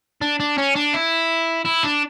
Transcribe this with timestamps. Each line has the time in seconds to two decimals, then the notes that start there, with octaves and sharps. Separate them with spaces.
0.22 D4
0.40 D4
0.58 C#4
0.75 D4
0.93 E4
1.65 E4
1.83 D4